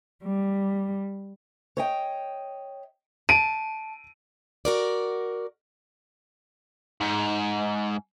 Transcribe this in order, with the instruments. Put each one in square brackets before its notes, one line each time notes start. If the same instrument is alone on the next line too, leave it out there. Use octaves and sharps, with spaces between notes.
[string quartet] G3
[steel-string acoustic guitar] C#5 D#5 G5
[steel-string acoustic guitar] A5 [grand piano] D7 D#7
[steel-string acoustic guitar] F#4 A#4 D5
[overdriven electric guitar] G#2